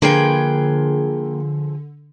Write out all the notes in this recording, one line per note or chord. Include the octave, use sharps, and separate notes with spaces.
D3 F3 A#3 G#4 B4 G5